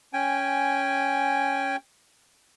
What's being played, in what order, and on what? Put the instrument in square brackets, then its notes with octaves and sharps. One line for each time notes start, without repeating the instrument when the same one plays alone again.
[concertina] C#4 G5 G#5